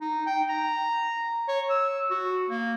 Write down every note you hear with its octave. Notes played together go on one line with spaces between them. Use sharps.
D#4
G5
A#5
C#5
E6
F#4
A#3